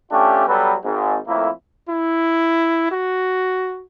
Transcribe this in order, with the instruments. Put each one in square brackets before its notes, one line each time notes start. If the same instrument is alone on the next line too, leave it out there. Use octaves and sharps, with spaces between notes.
[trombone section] A3 C#4 D4 F4 G4
F#3 G3 B3 F#4 A4 B4
G#1 G#2
F2 A2 A#3 E4
[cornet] E4
F#4